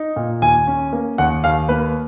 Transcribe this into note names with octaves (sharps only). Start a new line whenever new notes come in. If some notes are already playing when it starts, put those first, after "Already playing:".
Already playing: D#4
A#2
D#2 G#5
C#4
A#3
D#2 F#5
D#2 F5
A#3 B4